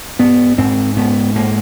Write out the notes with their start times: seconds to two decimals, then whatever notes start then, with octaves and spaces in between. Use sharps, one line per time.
0.19 G#2 B3
0.58 G#2 C4
0.96 G#2 B3
1.35 G#2 A#3